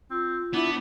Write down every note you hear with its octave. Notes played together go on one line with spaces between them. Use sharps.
C4 F4
B3 D4 E4